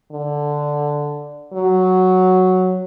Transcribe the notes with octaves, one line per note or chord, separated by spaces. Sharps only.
D3
F#3